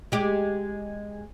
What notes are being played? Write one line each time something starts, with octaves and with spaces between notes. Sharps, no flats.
G#3 G4